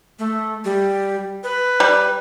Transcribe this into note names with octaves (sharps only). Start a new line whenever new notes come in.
A3
G3
B4
G3